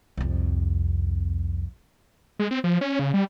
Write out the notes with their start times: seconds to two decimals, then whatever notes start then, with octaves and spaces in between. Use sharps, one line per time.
0.17 C2 F2
2.39 G#3
2.51 C4
2.64 F3
2.81 C#4
2.99 C#3
3.14 G3